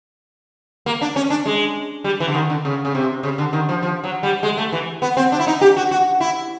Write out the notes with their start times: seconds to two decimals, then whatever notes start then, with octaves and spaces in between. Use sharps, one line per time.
0.86 A#3
1.01 D4
1.16 C#4
1.30 D4
1.46 G#3
2.04 G3
2.20 E3
2.28 D3
2.34 D#3
2.50 D3
2.65 C#3
2.85 C#3
2.95 C3
3.23 C#3
3.38 D3
3.53 D#3
3.69 F3
3.83 F3
4.04 F#3
4.23 G3
4.43 G#3
4.57 A3
4.72 E3
5.02 B3
5.17 C4
5.32 D4
5.39 E4
5.47 D#4
5.61 G4
5.77 F#4
5.91 F#4
6.20 E4